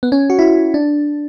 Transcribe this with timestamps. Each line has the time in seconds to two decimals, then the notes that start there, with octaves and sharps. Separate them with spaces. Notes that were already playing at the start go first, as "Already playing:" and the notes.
0.03 B3
0.12 C#4
0.30 F#4
0.39 E4
0.74 D4